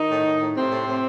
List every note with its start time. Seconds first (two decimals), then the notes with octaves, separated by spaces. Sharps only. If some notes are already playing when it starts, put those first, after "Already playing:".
Already playing: D#3 D#4
0.09 A2
0.24 A2
0.39 A2
0.56 A2 C3 C4
0.71 A2
0.87 A2